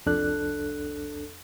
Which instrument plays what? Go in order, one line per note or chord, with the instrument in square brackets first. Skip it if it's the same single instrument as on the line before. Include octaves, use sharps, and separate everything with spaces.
[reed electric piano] C2 F2 D4 A4 F#6